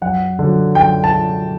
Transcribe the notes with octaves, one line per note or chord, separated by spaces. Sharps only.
F#2 F#5
D3 F#3
F#2 G5
A5